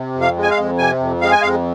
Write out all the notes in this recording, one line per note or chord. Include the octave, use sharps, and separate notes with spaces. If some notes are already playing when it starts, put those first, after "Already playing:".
Already playing: C3
F2
F5
G#3
G#5
F5
F2
C3 G#5
F2
G#3 F5
G#5
F2 F5